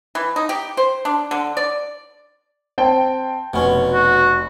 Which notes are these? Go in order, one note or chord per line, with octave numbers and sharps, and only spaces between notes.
E3
D#4
G4
C5
D4
D3
D5
C4 G5 A5
F1 B2 C#4
F#4